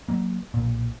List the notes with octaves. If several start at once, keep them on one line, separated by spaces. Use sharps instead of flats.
F#3 A#3
B1 A#2